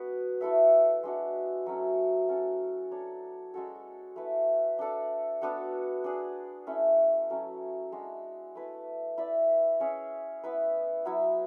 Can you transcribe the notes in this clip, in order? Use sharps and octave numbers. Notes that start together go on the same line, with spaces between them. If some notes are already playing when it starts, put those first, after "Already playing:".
Already playing: B3 D4 F#4 B4
A3 E4 A4 E5
G#3 D4 F#4
F#3 A3 C#4
C#4 F#4 A4
D4 A4 C#5
G#3 C#4 F#4 A4
A3 E4 B4
D4 A4 D5
B3 D4 F#4 A4
D4 G#4 D5
A3 C#4 E4
F#3 A3 C#4
G#3 D4 F#4
A3 E4 B4
E4 B4 D5
C#4 G#4 C#5 E5
B3 E4 B4
F#3 B3 E4